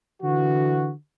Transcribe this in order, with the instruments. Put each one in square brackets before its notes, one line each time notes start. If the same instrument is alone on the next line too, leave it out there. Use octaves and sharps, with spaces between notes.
[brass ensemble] D3 E3 F#4